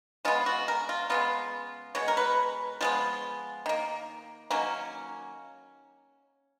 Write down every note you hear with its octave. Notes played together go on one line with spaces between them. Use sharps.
C#3 G#3 B3 F4
F#4
A#4
F4
C#3 G#3 B3 F4
B2 G#3 C#5
A#4
B4
F3 G#3 B3 F4
D#3 A#3
D#3 F#3 A#3 C#4